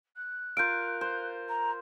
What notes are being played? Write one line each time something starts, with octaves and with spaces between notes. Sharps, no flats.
F#6
F4 A#4 F5 G6 D7
C5
A#5